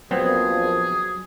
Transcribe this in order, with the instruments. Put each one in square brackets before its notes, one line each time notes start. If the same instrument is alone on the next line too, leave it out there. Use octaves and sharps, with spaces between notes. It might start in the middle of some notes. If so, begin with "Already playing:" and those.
[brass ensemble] A#1 F3 [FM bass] F#3 [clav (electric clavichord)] B3 C4 [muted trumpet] G#4